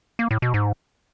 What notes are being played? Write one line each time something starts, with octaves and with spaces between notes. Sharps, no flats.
A#3
A2
B2
G#2